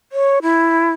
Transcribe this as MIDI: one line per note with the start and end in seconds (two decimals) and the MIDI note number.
0.12 0.39 73
0.42 0.92 64